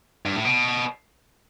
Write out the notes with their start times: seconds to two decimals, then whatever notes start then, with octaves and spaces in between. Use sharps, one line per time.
0.26 G2
0.35 A2
0.45 B2